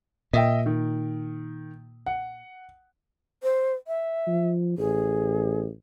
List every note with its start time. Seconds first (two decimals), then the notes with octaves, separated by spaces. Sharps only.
0.33 A#2 D#5 E5 G5
0.66 D#3
2.06 F#5
3.43 C5
3.87 E5
4.27 F3
4.78 A1 G#4